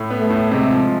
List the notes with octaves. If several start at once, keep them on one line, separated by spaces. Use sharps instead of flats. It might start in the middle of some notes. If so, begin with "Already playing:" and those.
Already playing: A2
B3
A3
A2
C3 G#3
F3